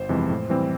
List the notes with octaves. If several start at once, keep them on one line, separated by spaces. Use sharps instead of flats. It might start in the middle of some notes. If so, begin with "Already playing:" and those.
Already playing: G1 C5
F2 C3 E3 G#3
A2
E3 G3 C4